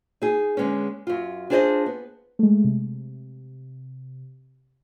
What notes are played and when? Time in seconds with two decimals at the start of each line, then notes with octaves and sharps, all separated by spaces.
0.22 D#4 G#4
0.57 D3 G#3 B3 C#4
1.07 F#2 F4
1.50 D4 F4 G#4 C5 D5 D#5
1.86 B3
2.39 G#3 A3
2.64 C3